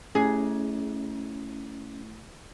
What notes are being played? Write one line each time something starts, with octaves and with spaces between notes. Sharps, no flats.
A3 C#4 E4 G#4